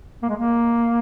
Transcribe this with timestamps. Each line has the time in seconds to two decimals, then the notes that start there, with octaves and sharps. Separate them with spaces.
0.23 A#3
0.29 G#3
0.36 A#3